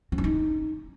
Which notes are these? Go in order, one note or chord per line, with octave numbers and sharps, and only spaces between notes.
C4
D4
D#4